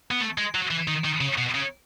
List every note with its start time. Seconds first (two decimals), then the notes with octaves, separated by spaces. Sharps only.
0.11 B3
0.21 A3
0.38 G#3
0.55 F#3
0.71 E3
0.88 D#3
1.05 D#3
1.21 C#3
1.38 B2
1.54 C#3